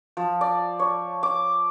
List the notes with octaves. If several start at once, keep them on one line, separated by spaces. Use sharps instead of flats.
F3
D5
C#5
D6